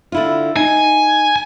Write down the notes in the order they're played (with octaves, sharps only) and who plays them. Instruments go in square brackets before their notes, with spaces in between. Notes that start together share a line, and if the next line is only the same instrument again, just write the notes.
[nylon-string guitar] D3 E4 F4
[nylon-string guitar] D#4 [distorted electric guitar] G#5